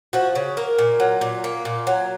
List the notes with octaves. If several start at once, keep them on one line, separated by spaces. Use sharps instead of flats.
F3 F#4
C#3
A#3 A#4
A#2
F#3
A#2
A#3
A#2
F#3